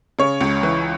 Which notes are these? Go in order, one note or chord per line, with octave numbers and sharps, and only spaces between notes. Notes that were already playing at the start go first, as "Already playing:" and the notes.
C#3 C#5
C#2
E3